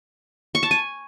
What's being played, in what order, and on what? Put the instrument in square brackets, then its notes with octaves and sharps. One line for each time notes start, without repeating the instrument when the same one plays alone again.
[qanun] C#6
A5
G#5